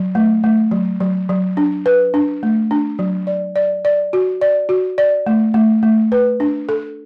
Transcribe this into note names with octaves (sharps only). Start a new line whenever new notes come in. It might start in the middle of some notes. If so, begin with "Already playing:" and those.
Already playing: F#3
A3
A3
F#3
F#3
F#3
D4
B4
D4
A3
D4
F#3
D5
D5
D5
F#4
D5
F#4
D5
A3
A3
A3
B4
D4
A4